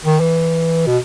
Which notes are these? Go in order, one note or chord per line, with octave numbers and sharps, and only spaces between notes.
D#3
E3
B2